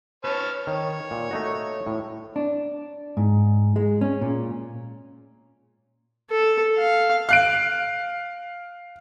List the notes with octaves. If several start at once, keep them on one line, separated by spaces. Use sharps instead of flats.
B4 C#5 A5 F6
D#3 C#5
A#2
A3 D#4 F#4
A2
D4
G#2
G#3
C#4
A#2
A4
F5
F5 F#6 D7